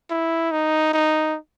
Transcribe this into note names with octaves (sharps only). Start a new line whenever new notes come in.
E4
D#4
D#4